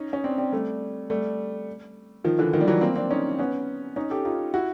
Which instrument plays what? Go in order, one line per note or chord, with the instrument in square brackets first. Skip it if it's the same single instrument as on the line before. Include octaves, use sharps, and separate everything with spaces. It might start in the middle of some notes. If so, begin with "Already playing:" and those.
Already playing: [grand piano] C#4 D#4
C#4
C4 D4
C4 D4
G3 A3
G3 A3
D#3 F3
D3 E3
D#3 F3
G3
E3 F#3
A#3 C4
C4 D4
C#4 D#4
B3 C#4
C#4 D#4
G4 A4
D#4 F4
E4 F#4